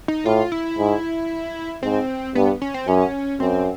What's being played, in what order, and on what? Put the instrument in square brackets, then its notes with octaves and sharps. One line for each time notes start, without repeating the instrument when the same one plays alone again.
[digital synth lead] D#4
[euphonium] A2 [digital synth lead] F4
[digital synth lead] E4
[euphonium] G#2
[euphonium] G#2 [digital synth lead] C4
[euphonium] G2 [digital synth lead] B3
[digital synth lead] C#4
C4
[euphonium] F#2 [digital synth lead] C#4
[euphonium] F#2 [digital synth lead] C4